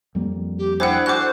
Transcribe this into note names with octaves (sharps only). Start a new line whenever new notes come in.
F2 G3 A#3
G4
D4 E4 G#4 C5 F#5 G5
F#4 A4 C5 D6 F#6